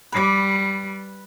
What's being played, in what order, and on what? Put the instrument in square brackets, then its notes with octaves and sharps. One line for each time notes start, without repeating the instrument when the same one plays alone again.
[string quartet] G3 [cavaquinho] B4 D6